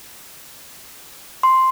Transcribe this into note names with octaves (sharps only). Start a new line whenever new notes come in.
C6